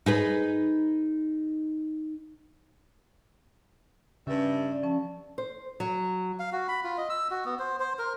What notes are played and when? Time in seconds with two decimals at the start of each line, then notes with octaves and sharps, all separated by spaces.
0.06 D#4 G#4 B4
4.27 G2 C#3 G3 C#4 E5
4.72 D5
4.83 F3 C#4 A5
5.38 C5
5.80 F#3
6.39 F5
6.52 F#4
6.68 B5
6.84 F4
6.98 D#5
7.10 E6
7.31 F#4
7.45 B3
7.59 C5
7.80 C5
7.99 A#4